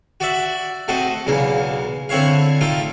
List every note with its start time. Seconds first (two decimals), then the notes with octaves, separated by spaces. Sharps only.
0.20 F#4 D5 E5
0.88 A3 C4 F#4 D#5
1.27 B1 E2 C#3 A#3
2.09 D3 C4 E4 C#5 F5
2.61 A3 D#4 F4 G5